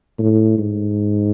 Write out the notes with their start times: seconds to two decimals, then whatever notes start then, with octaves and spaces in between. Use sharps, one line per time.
0.19 A2
0.58 G#2